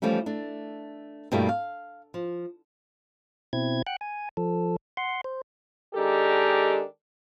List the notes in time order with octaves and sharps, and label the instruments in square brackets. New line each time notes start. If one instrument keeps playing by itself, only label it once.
[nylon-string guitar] E3 F3 G3 A3 C#4
A3 D4
G2 B2 G3 A3 A#3 E4
F5
F3
[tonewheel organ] B2 C4 E4 G#6
F#5 G5 F#6
G#5
F3 A4
F#5 C6
C5
[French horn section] D#3 G#3 D4 G4 A4 A#4